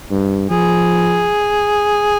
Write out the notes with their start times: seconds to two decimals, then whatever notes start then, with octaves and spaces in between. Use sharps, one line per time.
0.11 G2
0.50 F3 G#4